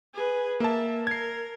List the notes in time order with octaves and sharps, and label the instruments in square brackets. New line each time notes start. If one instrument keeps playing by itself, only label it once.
[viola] G#4 B4
[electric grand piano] A#3 A5 [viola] E5
[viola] A#4 [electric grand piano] G#6 C7